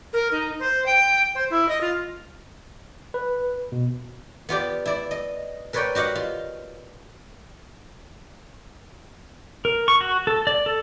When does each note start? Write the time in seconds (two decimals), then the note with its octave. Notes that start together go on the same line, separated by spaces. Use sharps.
0.13 A#4
0.32 D#4
0.60 C5
0.86 G5
1.35 C5
1.50 E4
1.69 D#5
1.81 F4
3.14 B4
3.72 B2
4.49 B3 F4 G4 D5
4.85 E4 D5
5.11 D#5
5.73 A#4 B4 C#5 D5 F#5 G5
5.95 F#4 G4 D#5 F5 F#5
6.15 F4
9.65 A#4
9.88 C#6
10.01 F#4
10.27 A4
10.47 D5
10.66 A4